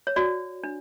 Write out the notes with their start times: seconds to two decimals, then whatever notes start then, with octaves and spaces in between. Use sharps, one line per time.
0.07 C#5
0.16 F#4 D5
0.64 D4